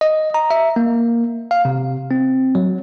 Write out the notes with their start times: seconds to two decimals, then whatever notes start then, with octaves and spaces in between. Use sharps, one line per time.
0.01 D#5
0.34 A#5
0.51 E5
0.76 A#3
1.51 F5
1.65 C3
2.11 C4
2.55 F#3